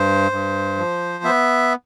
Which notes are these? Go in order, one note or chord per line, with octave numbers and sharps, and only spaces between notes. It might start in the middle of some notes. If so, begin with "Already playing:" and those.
Already playing: G2 C5
G2
F3
B3 E5